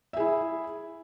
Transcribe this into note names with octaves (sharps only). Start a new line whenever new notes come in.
E4 G#4 E5